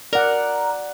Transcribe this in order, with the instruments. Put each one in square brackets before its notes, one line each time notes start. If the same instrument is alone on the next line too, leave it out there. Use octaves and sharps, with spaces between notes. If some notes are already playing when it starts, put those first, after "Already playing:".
[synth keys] A#4 [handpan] D5 F#5